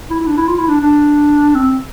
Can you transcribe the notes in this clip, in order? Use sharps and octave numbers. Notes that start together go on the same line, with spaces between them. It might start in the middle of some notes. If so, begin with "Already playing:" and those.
E4
E4
D4
E4
F4
E4
D4
D4
C4